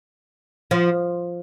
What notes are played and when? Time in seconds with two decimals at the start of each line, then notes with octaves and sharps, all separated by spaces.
0.71 F3